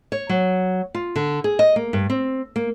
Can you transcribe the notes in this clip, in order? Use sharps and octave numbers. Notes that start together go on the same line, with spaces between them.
C#5
F#3
F4
D3
G#4
D#5
A#3
G2
C4
A#3